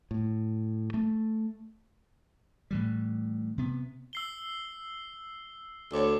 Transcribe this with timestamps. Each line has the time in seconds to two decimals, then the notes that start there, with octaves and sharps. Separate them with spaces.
0.11 A2
0.94 A3
2.71 A2 E3 G3
3.58 C3 B3
4.13 E6 C7 G7
5.93 D2 C#5 D6